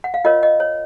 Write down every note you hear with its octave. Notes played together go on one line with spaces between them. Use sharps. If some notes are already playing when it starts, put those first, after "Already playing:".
F#5
F5
F4 A#4 C#5 D#5
D#5
C#5